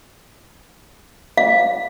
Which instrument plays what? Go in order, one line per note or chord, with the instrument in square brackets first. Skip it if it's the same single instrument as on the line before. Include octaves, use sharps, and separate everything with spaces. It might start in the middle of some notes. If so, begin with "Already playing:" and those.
[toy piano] F5